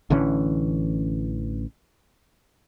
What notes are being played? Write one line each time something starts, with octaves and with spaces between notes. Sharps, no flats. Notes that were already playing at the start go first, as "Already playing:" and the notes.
A1 D3 E3 C#4